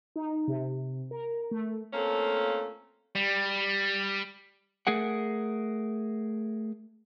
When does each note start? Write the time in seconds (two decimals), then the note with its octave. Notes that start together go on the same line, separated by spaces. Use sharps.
0.16 D#4
0.48 C3
1.11 A#4
1.51 A3
1.93 A3 A#3 C4 C#4 F4 A4
3.15 G3
4.87 A3 G#4 A#4 F#5